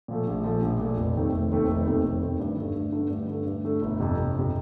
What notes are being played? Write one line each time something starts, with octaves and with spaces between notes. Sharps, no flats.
A#2 F3 A3
A#1
A#2 F3 A3
A#1
A#2 F3 A3
F1
D#2 D#3 A3 C4
F1
D#2 D#3 A3 C4
F1
D#2 D#3 A3 C4
F1
D#2 D#3 A3 C4
G2
D3 A3
G2
D3 A3
G2
D3 A3
G2
D3 A3
G1
F2 C3
G1
F2 C3